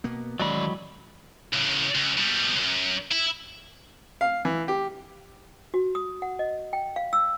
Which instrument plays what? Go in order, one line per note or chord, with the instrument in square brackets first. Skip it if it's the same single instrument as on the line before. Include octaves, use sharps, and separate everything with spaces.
[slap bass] B2 A#3 B3
[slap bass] A1 G#3 [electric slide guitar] D#3 D5 [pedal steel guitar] F#3 D#5 B5
[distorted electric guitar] C#2 A2
C#2
B2 G3
C#2 F#2
E4
[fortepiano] F5
E3
G4
[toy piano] F#4
D#6
F#5
D#5
G5
F5
E6